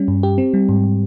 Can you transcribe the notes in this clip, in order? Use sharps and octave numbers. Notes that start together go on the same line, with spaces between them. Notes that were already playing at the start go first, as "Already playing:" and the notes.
Already playing: G3 C#4
G2
G4
C4
G3
G#2